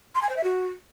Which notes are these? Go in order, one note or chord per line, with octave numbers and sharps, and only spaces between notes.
C6
G#5
C5
E5
F#4